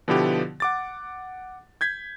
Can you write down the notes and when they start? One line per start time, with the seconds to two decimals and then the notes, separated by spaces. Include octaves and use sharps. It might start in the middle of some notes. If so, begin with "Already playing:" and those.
0.08 B2 D3 F3 B3 E4 G4
0.60 F#5 D6 A6
1.81 G6 G#6 B6